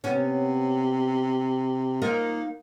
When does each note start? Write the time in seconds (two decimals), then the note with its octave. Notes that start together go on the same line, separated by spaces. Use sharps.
0.04 C3 B3 C#4
2.02 A#3 D#4 F4 A#4